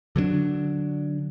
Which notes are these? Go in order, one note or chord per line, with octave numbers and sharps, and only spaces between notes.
D3 F#3 A#3 D4